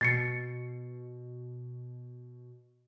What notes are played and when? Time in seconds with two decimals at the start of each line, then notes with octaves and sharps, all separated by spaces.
0.01 B2 A6 C7 C#7